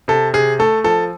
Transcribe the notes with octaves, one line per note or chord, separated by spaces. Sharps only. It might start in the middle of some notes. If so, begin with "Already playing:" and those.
C3 A4
C3 G#4
A3 A4
F3 A4